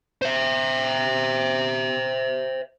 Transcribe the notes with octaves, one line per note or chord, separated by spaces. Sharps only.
C5 E5